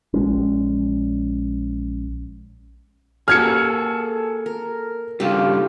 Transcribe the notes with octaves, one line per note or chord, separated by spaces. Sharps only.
A#1 G#3 C#4
A#3 F#4 G#4 A4 F6 G#6 C#7
A#4
G2 C#3 F4 G4 A4